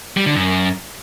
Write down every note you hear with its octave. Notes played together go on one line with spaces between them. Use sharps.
G3
D3
F#2